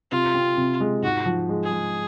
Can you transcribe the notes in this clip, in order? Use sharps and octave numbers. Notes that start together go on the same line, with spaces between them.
C3 F4
C4
C3
G#3
G#2 F#4
F3
G#3
G#4
G#3